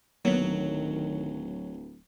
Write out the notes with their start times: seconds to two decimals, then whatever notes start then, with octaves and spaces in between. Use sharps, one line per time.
0.25 D1 D#3 F#3 A#3 B3